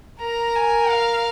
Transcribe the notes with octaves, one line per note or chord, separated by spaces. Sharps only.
A#4 A#5
G#5
F5